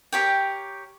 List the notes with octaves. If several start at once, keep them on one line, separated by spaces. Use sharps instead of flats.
G4 A#4 C#5 G5